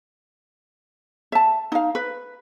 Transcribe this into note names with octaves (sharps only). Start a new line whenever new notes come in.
E5 A5
D#4 F5
B4